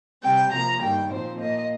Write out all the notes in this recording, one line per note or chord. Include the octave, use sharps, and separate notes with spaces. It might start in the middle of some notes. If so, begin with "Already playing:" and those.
C3 G3 C4 G5
C3 F3 A#3 A#5
G2 D#3 G3 A#3 G5
A#2 F3 C4 C5
A#2 A#3 D#5